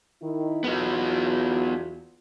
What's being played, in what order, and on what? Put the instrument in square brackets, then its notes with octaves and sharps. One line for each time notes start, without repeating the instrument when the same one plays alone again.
[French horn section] D#3 E4
[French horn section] E2 F4 F#4 [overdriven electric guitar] B3 D#4